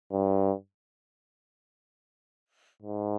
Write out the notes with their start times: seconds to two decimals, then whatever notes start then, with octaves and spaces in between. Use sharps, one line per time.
0.11 G2
2.82 G#2